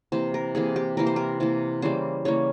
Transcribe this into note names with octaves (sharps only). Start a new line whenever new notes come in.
C3 E3 A#3 C5
A#4
C3 E3 A#3 G#4
G4
C3 E3 A#3 A#4
C5
A#4
C3 E3 A#3
C#3 E3 G3 A#3 C5
C#3 E3 G3 A#3 C#5